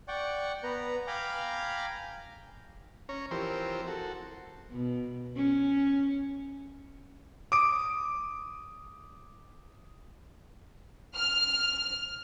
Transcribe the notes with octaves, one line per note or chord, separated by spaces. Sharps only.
D5 F#5 G5 C#6
B3 B4 A#5
F5 G5 G#5 A#5 B5 D6
C#4 C#5 A#5
E3 F3 C4 G4 A#4 C5
F#4 A4
B2
C#4
D6 D#6 D7
F6